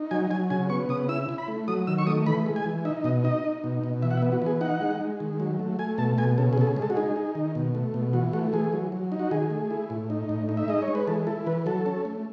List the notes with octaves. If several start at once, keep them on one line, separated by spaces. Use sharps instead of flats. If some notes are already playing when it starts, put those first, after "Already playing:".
Already playing: D#4
F#3 G#5
F#3 G#5
C#3 G#5
B3 C#6
C#3 D#6
E4 E6
E4
B5
A3
F#3 D#6
D#3 E6
C#6
A3 D#6
E3 B5
G#3
G#5
E3
D#4 E5
B2 D#5
D#4 D#5
D#4
B2
B2
E3 E5
F#5
E5
B3
F#4
E3 G#4
D#4 F#5
G#3
G#3
D#3
F#3
A3
A3 G#5
B2 A5
B2 G#5
C#3 A4
G#4
C#3 A4
G#4
G#3
A4
F#4
D#4 G#4
D#4
D#3
B2
A3
B2
E3 F#4
A3 F#4
E3 G#4
F#3
F#3
D#4
F#4
D#3 G#4
A3
E4
A2
D#4
A2
D#4
E5
G#3 D#5
C#5
G#3
B4
E3 A4
E4 A4
E3 B4
F#3 A4
C#4
A3